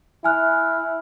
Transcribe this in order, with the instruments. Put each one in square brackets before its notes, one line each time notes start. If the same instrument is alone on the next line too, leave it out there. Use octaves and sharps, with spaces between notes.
[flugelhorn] E4 [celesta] G#5 F6 F#6